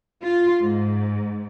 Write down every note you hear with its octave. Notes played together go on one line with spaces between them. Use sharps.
F4
G#2